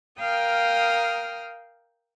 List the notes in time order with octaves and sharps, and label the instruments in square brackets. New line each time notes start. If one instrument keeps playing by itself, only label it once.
[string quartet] A#4 F5 G5 D#6 F6